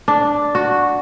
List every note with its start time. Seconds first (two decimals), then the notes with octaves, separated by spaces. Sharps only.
0.08 D4
0.55 F#4